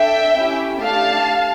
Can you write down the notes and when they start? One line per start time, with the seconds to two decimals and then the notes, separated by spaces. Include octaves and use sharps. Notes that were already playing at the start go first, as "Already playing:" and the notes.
Already playing: D4 A4 E5 G5
0.35 C#4 E4 G4
0.81 A3 D4 G4 F5 A5